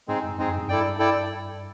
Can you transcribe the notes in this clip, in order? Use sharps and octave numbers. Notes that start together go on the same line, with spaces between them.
G#2 G#3 C4 D#4 G#4
F#2
F2 G#3 C4 D#4 G#4
F#2
G2
G2 E4 A4 D5 G5
E4 A4 D5 G5